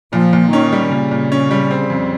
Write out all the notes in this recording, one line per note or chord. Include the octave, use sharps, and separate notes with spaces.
A#2 F3
A#2
D#3 C#4
G3
A#2 C#3
A#2
C#4
G3
C4
F2